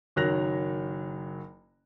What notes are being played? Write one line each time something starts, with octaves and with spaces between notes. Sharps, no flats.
F#1 D#3 F#3 F#6 A#6 F7